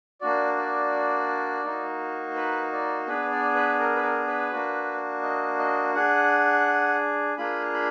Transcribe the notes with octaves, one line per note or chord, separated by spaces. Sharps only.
A#3 D4 F#4 D5
D5
A#3 D#4 F#4
B4
D5
B3 D4 G#4 B4
D5
B4
A#4
B4
A#4
B4
A#3 D4 F#4
D#5
D#5
D4 G#4 F#5
A#3 D4 F4 G#4 B5
B5